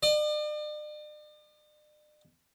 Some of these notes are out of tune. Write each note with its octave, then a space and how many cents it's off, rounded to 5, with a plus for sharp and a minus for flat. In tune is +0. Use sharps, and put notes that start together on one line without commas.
D5 +45